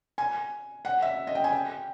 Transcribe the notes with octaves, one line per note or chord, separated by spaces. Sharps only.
G#5
F#5
E5
D#5
G5
G#5
G5